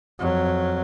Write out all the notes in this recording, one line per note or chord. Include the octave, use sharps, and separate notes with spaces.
F2 F#3